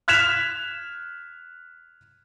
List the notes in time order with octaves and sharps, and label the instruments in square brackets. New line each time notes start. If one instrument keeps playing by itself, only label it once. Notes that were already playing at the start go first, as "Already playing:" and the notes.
[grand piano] F6 F#6 G#6 B6 E7 F7